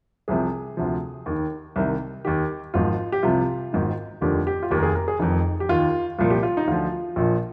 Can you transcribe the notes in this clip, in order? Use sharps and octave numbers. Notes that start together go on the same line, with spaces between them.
C2 C3 F3 G#4
D2 C3 F3
D#2 D#3
C2 C3 D#3
D#2 D#3 G4
G#1 G#2 F3 F4
G4
C2 C3 F3 F4
G#1 G#2 D#3
F1 D#2 D3 F3 G4
G4
F4
F1 D#2 D#3 G4
A#4
G#4
A#4
G#4
F1 F2 D#3 D#4
G4
D#2 D#3 F4
C2 A#2 F3 F4
G4
F4
D#4
D2 D3 F3 F4
A#1 A#2 F3